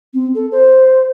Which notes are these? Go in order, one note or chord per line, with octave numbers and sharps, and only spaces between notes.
C4
A4
C5